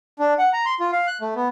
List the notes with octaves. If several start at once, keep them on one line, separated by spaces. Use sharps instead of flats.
D4
F#5
A#5
C6
F4
F5
F#6
A3
B3